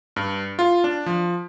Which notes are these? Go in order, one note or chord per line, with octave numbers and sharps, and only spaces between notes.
G2
F4
D4
F3